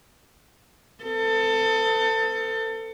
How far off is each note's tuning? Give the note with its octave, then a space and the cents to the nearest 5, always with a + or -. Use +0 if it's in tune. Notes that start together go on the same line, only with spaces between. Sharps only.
C4 -45 A4 +25